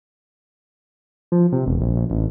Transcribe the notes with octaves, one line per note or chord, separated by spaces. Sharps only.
F3
C3
E1
A#1
A#1
A1